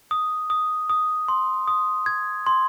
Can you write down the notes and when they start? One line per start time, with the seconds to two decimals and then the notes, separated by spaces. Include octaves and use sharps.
0.11 D#6
0.50 D#6
0.90 D#6
1.28 C6
1.68 D#6
2.06 G#6
2.47 C6